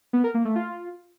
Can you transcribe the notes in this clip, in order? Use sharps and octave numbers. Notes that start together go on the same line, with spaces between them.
B3
A#4
A#3
A3
F4